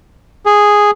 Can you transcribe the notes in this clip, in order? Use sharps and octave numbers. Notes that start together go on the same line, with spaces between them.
G#4